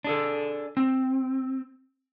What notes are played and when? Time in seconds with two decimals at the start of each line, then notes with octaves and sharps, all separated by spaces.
0.04 D4 G#4 A4
0.77 C4